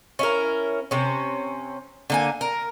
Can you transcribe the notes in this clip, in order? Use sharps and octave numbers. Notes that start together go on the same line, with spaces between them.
C#4 E4 A#4
C3 C#4
D3 A#3 G#5
A#4